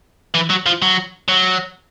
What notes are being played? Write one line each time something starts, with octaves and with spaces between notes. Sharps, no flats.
E3
F#3
F3
F#3
F#3